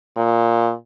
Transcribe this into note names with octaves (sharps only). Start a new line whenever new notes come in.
A#2